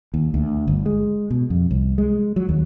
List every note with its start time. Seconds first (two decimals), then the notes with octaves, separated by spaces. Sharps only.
0.14 D#2
0.34 D2
0.68 G1
0.86 G#3
1.30 B2
1.50 F2
1.71 C2
1.98 G#3
2.36 F#3
2.49 D#2